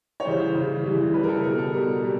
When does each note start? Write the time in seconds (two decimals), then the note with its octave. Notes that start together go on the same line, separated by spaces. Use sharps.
0.20 C#5
0.24 C#3 E3 G3 C5
0.40 C5
0.55 C#3 E3 G3
0.84 C#3 E3 G3
1.14 C#3 E3 G3 B4
1.23 A#4
1.29 A4
1.43 B2 G3 A#4
1.58 A4
1.73 B2 G3 A#4
2.03 B2 G3